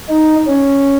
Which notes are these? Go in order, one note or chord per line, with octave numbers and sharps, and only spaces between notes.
D#4
C#4